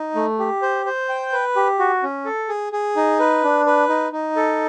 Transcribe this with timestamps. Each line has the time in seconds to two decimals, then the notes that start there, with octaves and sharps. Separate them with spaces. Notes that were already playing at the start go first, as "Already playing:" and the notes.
Already playing: D#4
0.15 A3
0.39 G4
0.62 C5
0.86 C5
1.09 G5
1.32 B4
1.56 G4
1.79 F#4
2.03 C#4
2.25 A4
2.49 G#4
2.73 G#4
2.97 D#4
3.20 B4
3.43 D4
3.66 B4
3.89 D#4
4.12 D#4
4.36 A4